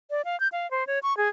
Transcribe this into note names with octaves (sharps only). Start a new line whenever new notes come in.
D5
F5
G6
F5
C5
C#5
C#6
G#4